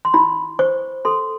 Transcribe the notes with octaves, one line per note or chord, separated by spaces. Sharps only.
C6
E4 B5
C5 C#6
A4 C6